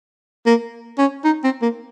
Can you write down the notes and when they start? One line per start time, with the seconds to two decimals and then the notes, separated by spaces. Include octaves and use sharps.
0.46 A#3
0.98 C#4
1.24 D#4
1.44 C4
1.62 A#3